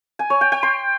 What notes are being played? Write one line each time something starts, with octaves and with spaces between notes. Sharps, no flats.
G#5
C#5
G5
G5
C6